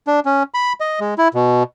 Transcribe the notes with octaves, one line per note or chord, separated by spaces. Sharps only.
D4
C#4
B5
D#5
G#3
E4
B2